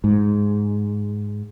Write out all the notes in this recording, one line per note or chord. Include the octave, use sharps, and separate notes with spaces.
G#2